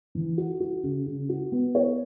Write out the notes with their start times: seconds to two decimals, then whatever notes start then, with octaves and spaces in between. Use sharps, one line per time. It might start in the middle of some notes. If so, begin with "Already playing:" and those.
0.15 E3
0.38 F#4
0.60 F#4
0.83 C#3
1.06 C#3
1.29 F#4
1.52 B3
1.75 C#5